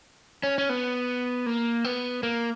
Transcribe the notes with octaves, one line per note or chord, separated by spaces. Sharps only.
C#4
C#4
B3
A#3
B3
A#3